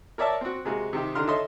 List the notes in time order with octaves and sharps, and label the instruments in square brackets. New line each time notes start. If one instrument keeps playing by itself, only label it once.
[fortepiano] A#4 C#5 D5 E5 A5
C4 F#4
C3 G#3 A#3 F#4
C3 D#3 G4
D3 D#3 A#5 C6 F6
A4 C#5 D#5 E5 C6